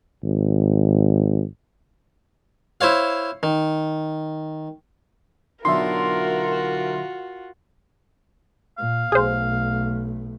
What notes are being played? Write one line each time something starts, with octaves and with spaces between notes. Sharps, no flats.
G#1
E4 C5 C#5 F5
D#3
B1 D3 F4 F#4 A#4 E5 C6
A#2 F5
B1 A3 G#4 C5